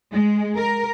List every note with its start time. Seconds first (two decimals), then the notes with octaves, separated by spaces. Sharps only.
0.11 G#3
0.57 A#4